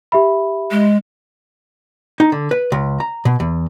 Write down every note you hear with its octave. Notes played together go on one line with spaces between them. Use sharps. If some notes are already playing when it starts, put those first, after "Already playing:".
G4 E5 B5
G#3
D#4
D3
B4
C#2
A#5
B2
E2